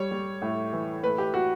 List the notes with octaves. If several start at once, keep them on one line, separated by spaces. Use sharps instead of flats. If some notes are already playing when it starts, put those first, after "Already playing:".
Already playing: G3 C#5
G3
A2
E3
A3 B4
G4
F#4